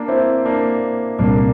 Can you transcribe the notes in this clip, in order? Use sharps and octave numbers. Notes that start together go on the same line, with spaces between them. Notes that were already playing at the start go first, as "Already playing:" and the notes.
Already playing: A#3 D4
C4 E4
A#3 D4
C2 A#2 G3 A#3 C4 D4